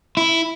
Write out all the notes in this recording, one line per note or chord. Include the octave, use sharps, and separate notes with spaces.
E4